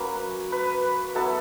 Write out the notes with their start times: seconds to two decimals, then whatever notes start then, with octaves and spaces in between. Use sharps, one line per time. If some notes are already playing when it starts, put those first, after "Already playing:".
Already playing: F#3 A#3 C#4 B4
0.52 B4
1.15 F#3 B3 E4 A4